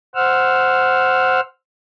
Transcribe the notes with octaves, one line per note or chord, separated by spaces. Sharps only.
C5 F#5 E6 F6